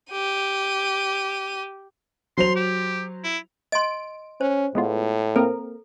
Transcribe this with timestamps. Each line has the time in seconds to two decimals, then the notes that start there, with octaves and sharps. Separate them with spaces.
0.11 G4 D#7
2.37 F#3 C5 C6 F7
2.56 G4
3.24 E4
3.72 D#5 C6 D7
4.41 C#4 C5
4.75 A2 G#3 B3 F4
5.36 A#3 C4 A4 A#4